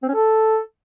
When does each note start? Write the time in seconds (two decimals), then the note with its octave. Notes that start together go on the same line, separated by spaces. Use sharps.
0.03 C4
0.09 C#4
0.14 A4